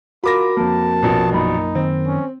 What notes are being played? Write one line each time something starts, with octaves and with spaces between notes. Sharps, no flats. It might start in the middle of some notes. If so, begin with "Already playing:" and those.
F4 F#4 A#4 B5 D6 A#6
F2 A#3 A5
A#1 B2
F#2 A#3 D#4 B5
D#3 C4
C#4